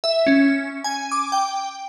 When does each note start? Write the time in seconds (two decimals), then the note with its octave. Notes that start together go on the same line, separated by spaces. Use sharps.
0.04 E5
0.27 C#4
0.84 G#5
1.12 D6
1.32 G5